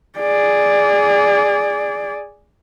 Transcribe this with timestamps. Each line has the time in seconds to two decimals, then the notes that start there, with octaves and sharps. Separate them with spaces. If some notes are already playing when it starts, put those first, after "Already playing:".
0.19 G#4 D5